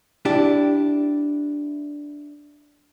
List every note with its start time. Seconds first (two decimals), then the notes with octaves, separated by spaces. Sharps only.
0.25 D4 E4 G4